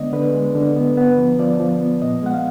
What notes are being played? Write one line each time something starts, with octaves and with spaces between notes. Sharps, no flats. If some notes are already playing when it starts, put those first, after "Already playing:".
Already playing: D3 G#3 B3 D5 D#5
D3 B4
G#3
D3
B3
B3
F3
F3 D5
F3
B3
A#2 D#5
G#3 F#5
F5